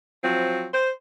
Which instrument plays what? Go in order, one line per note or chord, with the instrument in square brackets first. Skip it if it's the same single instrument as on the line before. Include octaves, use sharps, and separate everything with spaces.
[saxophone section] F3 F#3 C4
C5